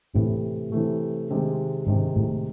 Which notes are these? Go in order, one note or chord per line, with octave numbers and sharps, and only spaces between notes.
A2 C3 E3 A3
C3 E3 A3
C3 D#3 G#3
G#2 C3 D#3 G#3
A2